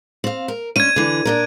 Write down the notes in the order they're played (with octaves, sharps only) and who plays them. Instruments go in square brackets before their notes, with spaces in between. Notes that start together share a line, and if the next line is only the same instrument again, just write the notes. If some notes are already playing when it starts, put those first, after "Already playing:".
[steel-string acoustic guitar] C4 F5
A#4
[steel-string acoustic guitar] D2 C#4 [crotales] G#6 D#7
[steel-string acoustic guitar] D3 E3
A#2 D4 A#4